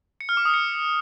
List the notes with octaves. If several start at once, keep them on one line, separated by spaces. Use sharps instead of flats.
C#7
F6
D6
D#6
C#7